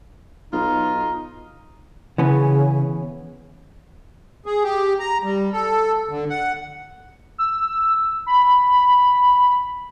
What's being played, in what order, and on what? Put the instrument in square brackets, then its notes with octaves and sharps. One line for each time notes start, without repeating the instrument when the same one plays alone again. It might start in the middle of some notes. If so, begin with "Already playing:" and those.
[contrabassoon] B1 [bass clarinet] D#4 [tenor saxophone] F4
[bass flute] C#3 [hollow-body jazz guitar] E3 B3 C#4
[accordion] G#4
G4
A#5
G3
A4
D3
F#5
[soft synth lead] E6
B5
B5